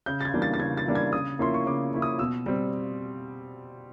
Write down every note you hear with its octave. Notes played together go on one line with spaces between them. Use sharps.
C#3 G6
A6
G#6
E3 G3 A#3 D4
A6
A6
C#3 G#6
A6
E3 G3 A#3 D4
G#6
C#3 D#6
F3 A#3 C#4 E4 C6
C#6
C#3 D6
F3 A#3 C#4 E4
D#6
B2 E6
G3 C4